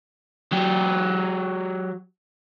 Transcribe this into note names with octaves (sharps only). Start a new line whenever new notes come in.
F#3 G4